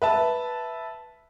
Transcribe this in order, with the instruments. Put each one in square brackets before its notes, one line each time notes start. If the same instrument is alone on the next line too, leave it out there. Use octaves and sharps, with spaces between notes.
[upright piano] B4 E5 A5